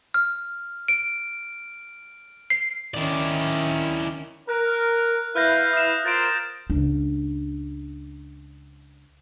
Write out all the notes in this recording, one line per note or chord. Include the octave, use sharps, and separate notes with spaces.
F6
D7
C7
D#3 C#4 E4 D5
A#4 F#6
E4 B4 F5 F6 G6 A#6
D#6 E7
F4 A#4 C5 A6 D7
C#2 D4